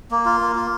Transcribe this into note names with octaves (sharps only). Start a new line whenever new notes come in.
A#3
F4
A#3
F4